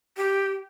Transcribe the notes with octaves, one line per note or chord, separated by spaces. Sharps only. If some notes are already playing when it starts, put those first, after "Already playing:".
G4